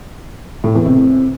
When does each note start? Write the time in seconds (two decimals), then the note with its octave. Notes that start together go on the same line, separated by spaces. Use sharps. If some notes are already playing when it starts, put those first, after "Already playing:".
0.64 A2
0.75 E2
0.86 C3